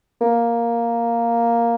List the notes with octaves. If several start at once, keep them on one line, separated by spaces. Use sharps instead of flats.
A#3